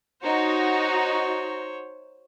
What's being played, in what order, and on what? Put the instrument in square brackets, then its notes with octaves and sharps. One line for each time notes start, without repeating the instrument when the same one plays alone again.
[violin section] D#4 F#4 [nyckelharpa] C5 C#5